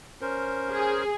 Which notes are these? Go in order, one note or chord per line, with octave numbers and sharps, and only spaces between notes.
C#4 A#4 C5
G#4